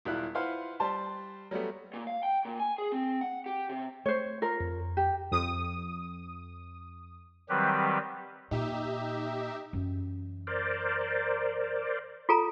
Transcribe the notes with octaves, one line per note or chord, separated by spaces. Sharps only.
E1 G3 E4 F4 F#6
E4 F4 B4 C5 F5 F#5
G3 C5 A5 C6
F#3 G3 A3 B3
A#2
F5
G5
A#2
G#5
G#4
C4
F#5
G4
C3
A3 C5 C#5
F4 A#4
F2
G4
F2 D#6
D#3 F#3 G3 C4 G4 B4
A#2 D#4 G4 E5
F#2 E3
A#4 C5 D5
F4 A4 A#5